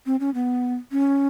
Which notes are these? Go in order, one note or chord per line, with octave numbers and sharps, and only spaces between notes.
C4
C#4
B3
C#4